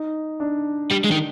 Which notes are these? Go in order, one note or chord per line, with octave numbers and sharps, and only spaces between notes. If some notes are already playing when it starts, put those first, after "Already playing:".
Already playing: D#4
D4
G3
G#3
D#3